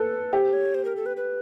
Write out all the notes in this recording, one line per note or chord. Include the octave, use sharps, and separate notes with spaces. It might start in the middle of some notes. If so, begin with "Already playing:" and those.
Already playing: A4 B4
G4 C5
C#5
C5
A#4
A4
B4
B4